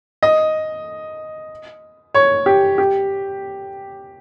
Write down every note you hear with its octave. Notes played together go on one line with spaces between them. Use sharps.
D#5
C#5
G4
G4